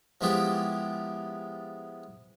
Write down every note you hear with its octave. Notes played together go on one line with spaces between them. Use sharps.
F3 G#3 B3 E4 F4 G4